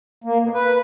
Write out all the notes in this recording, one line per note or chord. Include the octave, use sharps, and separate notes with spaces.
A#3
B2
B4